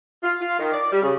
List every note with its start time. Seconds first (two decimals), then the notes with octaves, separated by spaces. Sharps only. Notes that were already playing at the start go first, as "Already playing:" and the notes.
0.22 F4
0.40 F4
0.58 D#3
0.72 D5
0.91 G3
1.02 C#3